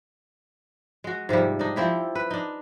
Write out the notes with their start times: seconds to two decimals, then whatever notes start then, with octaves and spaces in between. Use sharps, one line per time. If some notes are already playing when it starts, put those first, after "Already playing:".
1.04 G#3 F#4
1.29 G#2 C3 F3 G3
1.59 D4 D#4
1.76 F3 C4 E4 G4
2.15 B4
2.31 D4 D#4